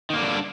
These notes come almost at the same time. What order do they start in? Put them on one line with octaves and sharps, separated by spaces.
D#3 A#3 D3 G3 D4